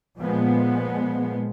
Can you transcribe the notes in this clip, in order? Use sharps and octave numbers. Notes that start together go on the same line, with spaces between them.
A#2 F3 G#3 B3